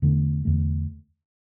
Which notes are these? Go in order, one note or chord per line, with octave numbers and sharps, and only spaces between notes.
E2 D3 A3
E2 D3 A3